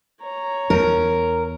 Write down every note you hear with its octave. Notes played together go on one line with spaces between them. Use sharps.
C#5 A#5
E2 A#4